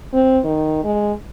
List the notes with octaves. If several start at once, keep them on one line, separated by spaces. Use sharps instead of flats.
C4
D#3
G#3